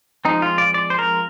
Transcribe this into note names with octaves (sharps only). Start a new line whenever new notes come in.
F3 G#3 C4 D#4
F4
D5
D5
C5
A#4